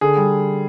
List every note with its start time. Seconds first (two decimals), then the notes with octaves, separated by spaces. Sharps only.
0.01 D3 G#4
0.17 G3